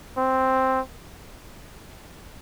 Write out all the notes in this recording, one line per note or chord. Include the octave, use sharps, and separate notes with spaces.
C4